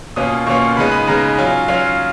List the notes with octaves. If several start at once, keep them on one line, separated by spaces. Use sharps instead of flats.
B2 A#3 C#4 F4 D#6
B2 A#3 C#4 F4 C#6
C#3 G#3 B3 D#4 B5
B5
C#3 G#3 B3 D#4 A#5
F#3 C#4 F4 G#5
F#3 C#4 F4 F5